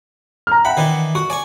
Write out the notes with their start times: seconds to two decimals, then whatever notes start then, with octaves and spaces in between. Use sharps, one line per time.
0.47 A#5 F6
0.65 E5 F#5 G5 B5
0.77 D#3 E3 D4
1.15 F#4 C#6
1.30 D5 G#5 C#6